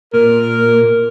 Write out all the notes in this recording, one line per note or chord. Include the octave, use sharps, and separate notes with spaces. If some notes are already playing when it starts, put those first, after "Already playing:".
A#2 A#4